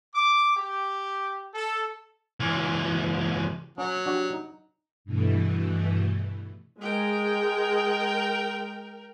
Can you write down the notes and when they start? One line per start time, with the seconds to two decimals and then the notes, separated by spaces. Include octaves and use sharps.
0.13 D6
0.56 G4
1.53 A4
2.40 C#2 E3
3.78 F#3 C#4 C#5
4.06 D4 F#4 G4
4.33 D#4
5.05 G2 B2 E3 A3
6.81 G#3 A#4 G5